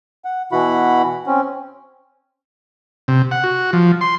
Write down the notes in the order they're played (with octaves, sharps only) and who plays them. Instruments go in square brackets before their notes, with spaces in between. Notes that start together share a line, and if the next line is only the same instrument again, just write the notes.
[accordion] F#5
B2 E3 E4 F#4 F#5 B5
C4 C#4
[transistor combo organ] C3
F#5
F#4
F3
C6